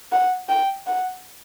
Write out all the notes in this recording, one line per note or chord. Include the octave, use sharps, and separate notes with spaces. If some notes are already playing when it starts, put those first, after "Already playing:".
F#5
G5
F#5